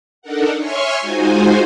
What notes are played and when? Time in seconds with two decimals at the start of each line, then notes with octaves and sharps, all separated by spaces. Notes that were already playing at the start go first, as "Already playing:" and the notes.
0.22 D4 D#4 A4 A#4 F#5
0.58 C#5 E5 G#5 C6 C#6 F6
1.01 G#3 D#4 F4 F#4 C5 G#5